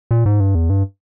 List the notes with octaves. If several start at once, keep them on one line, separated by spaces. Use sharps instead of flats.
A#2
G#2
G2
E2
G2